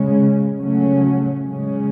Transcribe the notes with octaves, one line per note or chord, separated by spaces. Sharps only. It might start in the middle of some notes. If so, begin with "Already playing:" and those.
Already playing: C#3 G#3 C#4
C#3 F#3 A3 C#4
C#3 G#3 C#4